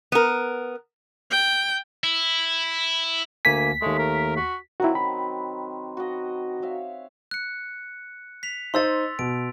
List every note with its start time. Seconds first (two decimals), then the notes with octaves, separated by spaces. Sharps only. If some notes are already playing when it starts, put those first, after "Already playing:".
0.12 B3 A#4
1.31 G5
2.04 E4
3.45 D2 A#3 G#5 B6
3.82 D#2 G#3 A3
3.99 A#4
4.37 F#4
4.80 D#3 F#3 C4 E4 F#4
4.95 B5
5.97 F#4 D#5
6.62 C#5 E5 F5
7.31 F#6 C#7
8.43 B6 F7
8.74 D#4 C5 D#5 C6 E6 A6
9.19 B2 D7